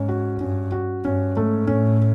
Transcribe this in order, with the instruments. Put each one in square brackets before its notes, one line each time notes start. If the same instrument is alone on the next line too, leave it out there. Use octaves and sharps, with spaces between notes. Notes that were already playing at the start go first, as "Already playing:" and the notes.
Already playing: [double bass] G#2 [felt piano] C#4
[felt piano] F#4
[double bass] G2 [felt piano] C#4
[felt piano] F#4
[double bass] G2 [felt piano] C#4
[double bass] G#2 [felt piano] A3
[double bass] A2 [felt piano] C#4